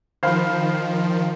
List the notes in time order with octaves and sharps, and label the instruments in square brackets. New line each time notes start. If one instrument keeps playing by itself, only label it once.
[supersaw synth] D#3 F3 [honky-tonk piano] C5 F5 B5